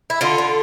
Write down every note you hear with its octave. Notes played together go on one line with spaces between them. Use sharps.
E4
D3 F4
D3